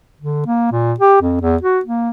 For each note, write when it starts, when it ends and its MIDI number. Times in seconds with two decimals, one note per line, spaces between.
0.20 0.42 50
0.46 0.71 58
0.71 0.93 46
1.00 1.20 67
1.21 1.36 41
1.41 1.57 40
1.62 1.80 66
1.85 2.10 58